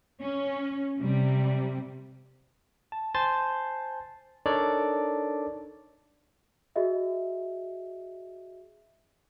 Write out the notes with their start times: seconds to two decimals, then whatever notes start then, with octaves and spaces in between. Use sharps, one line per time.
0.22 C#4
0.99 C3 G3
2.92 A5
3.15 C5 G#5 A5 C6 A6
4.46 D4 D#4 A4 A#4 C#5 D5
6.76 F#4 G#4 D#5 E5